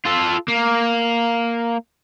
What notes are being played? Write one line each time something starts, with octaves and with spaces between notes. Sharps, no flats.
F4 A4
A#3